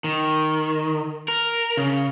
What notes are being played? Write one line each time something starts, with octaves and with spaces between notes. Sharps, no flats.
D#3
A#4
C#3